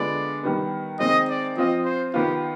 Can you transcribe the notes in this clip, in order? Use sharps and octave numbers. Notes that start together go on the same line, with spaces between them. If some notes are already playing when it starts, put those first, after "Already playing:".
Already playing: D3 G#3 B3 D4 F4 D5
D#3 G3 B3
D#3 G#3 C4 D#4 D#5
D5
F3 C4 F4 D#5
C5
D#3 B3 F4 G4